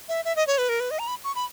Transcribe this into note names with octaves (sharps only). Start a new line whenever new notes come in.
E5
E5
D#5
C#5
B4
A#4
B4
D#5
A#5
B5
C#6
B5